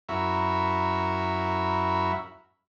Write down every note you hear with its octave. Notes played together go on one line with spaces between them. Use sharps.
F#2 E4 F#4 A#4 E5 B5